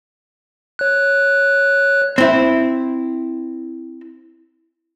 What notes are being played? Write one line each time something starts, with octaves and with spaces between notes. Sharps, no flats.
C#5 F#6
C4 E4